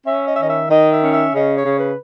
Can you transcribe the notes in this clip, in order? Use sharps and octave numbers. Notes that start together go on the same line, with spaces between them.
C#4 E5
D#5
E5
D#3 D#5
E5
D#3 D#5
E5
C#4
E5
C#3 D#5
C#5
C#3
B4